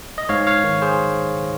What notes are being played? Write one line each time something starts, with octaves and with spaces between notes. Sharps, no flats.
D#5
G#2 C#5 F5
C#5 F5
D#3
G#4 C5